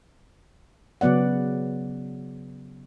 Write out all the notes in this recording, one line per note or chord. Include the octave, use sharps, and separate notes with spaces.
C#3 F#3 B3 D5 F#5